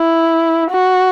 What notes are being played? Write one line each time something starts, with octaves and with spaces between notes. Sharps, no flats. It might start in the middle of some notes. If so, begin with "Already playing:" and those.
Already playing: E4
F#4